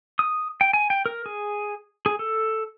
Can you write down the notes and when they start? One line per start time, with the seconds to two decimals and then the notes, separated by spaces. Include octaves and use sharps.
0.19 D#6
0.61 G5
0.73 G#5
0.90 G5
1.06 A#4
1.26 G#4
2.06 G#4
2.19 A4